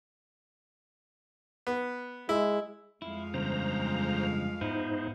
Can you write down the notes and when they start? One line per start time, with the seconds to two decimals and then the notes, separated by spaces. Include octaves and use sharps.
1.67 B3
2.29 G#3 E4
3.02 F2 G#3 E4 F5
3.34 E2 G2 C#3 C5 A#5
4.61 G#2 B3 D#4 E4 C5